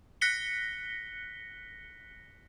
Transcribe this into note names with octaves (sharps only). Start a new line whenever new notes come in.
F#6 A#6 B6 C#7 G7